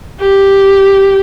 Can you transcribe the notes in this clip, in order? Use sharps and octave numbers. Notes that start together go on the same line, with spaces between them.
G4